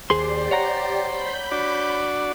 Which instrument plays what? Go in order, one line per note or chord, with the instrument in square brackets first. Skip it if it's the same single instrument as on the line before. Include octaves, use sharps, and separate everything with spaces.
[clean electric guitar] D#2 G#4 C6 [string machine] G4 D5 [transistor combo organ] C5
[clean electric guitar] C#5 F#5 A#5
[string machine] B5 G6 B6
[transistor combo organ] D4 F#4 D5